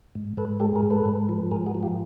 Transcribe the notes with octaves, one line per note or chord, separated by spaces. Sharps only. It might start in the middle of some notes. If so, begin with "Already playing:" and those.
G#2
G#2 A4 B4
G#3 G4 A4
G#4 A#4
G#2
A4 B4
G#2
F3
G#2 G#4 A#4
F#4 G#4
F3
F4 G4